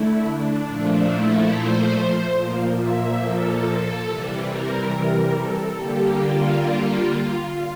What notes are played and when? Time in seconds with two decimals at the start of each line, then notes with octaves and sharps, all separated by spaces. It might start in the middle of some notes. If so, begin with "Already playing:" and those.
Already playing: D3 A3 E4
0.24 D4
0.67 A#2 F3 A3
1.09 E4
1.52 C5
2.37 A#2 F3 A#3
2.79 E5
3.22 A4
4.07 C3 E3 G3
4.49 A#4
4.92 A#4
5.34 A4
5.77 D3 G3 A#3 G4
6.20 F4